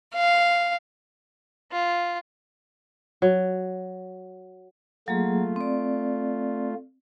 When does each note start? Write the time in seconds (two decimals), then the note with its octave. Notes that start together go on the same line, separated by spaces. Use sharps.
0.15 F5
1.72 F4
3.22 F#3
5.08 F#3 A3 A#3 F4 G#4
5.56 C4 D5